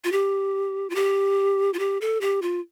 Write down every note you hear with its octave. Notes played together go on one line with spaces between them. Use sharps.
F4
G4
F4
G4
F4
G4
A4
G4
F4